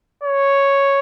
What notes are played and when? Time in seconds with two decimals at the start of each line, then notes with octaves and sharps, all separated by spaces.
0.23 C#5